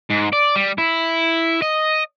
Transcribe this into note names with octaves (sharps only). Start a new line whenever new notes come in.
G#2
D5
G3
E4
D#5